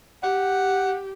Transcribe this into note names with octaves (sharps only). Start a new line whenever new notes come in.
G4 F#5